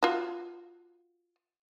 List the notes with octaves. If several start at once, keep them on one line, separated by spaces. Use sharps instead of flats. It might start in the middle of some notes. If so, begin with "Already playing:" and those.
F4 F#4